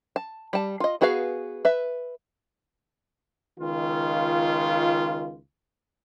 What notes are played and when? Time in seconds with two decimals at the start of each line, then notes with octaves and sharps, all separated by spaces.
0.16 A5
0.53 G3 A5
0.80 F4 D#5
1.01 B3 F#4 G#4 B4 F5
1.65 B4 E5
3.58 C#2 D#3 F4